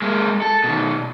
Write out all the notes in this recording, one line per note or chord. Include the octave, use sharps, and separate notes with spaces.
G#3 A#3
A4
B2 D#3